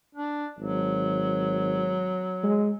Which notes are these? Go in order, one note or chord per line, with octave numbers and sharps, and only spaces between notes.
D4
G#1 F#3
G#3